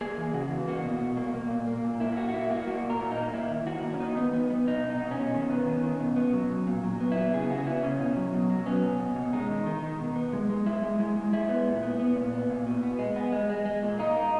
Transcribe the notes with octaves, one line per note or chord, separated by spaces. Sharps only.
A#3 G#4
E3
C#3 F#4
E3
A#3 F#4
B2
B2
A#3
A#3
A#2
A#3
A#2
A#3 E4
E4
A#3 F#4
F#4
A#3 E4
A#3 F#4
A#3 F#4
A#2
A#4
A#2
D#4
A#3
A#3 E4
D#3
D#3 F#4
A#3
C#4
D#3 D#4
B3
B3
B3
B2 D#4
B2
D#4
B2
C#4
B2
D#3
B3
D#3
D#3
B2
B3
F#3
B2
A#2
F#3
B3
B3 E4
C#3 G#4
C#3 F#4
B3 E4
C#3 C#4
B2
F#3
B2
F#3
B3 C#4
B2
B2
B2
G#3 D#4
D#3
D#3
D#3
B2
B3
G#3
G#3
G#3 E4
G#3
G#3
G#3
G#3 E4
B3
A#2
B3
B3
A#2
B3
A#2
B2
B3
G#3
B3
G#3
G#3
G#3
A#2
A#3 D#4
A#3